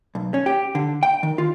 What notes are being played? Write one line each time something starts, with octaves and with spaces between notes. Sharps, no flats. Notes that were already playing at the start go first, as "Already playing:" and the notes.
B1
C#4
G4
D3
G5
D#3
F4